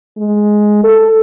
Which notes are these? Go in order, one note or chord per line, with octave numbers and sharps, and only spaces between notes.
G#3
A4